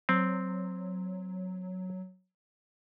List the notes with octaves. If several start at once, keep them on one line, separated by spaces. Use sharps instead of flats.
F#3 C4